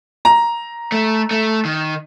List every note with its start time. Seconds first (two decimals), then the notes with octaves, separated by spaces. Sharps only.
0.25 A#5
0.92 A3
1.31 A3
1.65 D#3